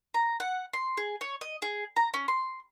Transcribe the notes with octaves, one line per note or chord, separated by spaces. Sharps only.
A#5
F#5
C6
G#4
C#5
D#5
G#4
A#5
C#4
C6